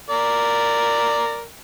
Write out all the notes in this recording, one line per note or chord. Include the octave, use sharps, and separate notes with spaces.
A#4 D5